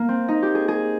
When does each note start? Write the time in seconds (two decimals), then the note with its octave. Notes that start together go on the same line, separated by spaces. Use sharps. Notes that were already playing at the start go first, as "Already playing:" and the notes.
Already playing: A#3
0.09 C4
0.28 D#4
0.43 G4
0.55 G#4
0.68 G#4